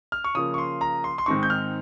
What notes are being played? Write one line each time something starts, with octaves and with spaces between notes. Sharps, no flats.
F6
C#6
C#3 F3 A#3 D#6
C#6
C6
A#5
C6
C6
G#2 D#3 G#3 C4 D#4 C#6
G6
F6